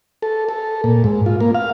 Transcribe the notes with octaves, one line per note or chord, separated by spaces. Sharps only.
A4
A4
A#2
G#2
F4
A#3
F5